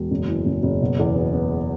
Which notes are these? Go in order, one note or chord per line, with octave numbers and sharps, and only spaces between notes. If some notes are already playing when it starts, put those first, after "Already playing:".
Already playing: E1
F#1
E3
F#1
F#1
B2
E2
B3
B3